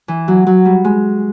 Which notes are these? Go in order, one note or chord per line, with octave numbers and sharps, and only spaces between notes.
E3
F#3
F#3
G3
G#3